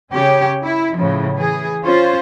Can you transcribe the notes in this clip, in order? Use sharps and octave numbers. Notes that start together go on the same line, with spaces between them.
C#3 C#4 G4 C#5
E4
A2 C#3 F3
E3 G#4
C#4 F4 C5